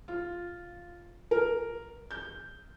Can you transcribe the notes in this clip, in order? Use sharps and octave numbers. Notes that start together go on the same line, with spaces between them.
F4
A#4
G6